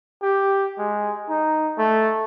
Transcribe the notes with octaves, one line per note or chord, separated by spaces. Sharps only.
G4
G#3
D#4
A3